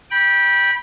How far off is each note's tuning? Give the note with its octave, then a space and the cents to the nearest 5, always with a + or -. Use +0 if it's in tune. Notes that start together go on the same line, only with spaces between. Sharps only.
G5 +5 B5 -25